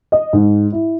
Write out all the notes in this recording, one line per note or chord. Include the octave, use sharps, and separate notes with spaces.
D#5
G#2
E4